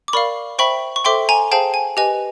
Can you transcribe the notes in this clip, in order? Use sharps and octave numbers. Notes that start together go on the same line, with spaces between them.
D6
A#4 D5 F5 B5 C#6
C5 E5 G5 B5 C#6
C#6
A4 C5 E5 G5 C6 D6
G#5 A#5
G#4 C5 F5 G5 A5
G#5
G4 B4 D#5 G#5